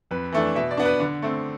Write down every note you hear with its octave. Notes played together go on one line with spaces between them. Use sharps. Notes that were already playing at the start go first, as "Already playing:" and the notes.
F2 B4
E3 A3 D4
B2 E5
D5
B3 D4
B4
D3
A3 C4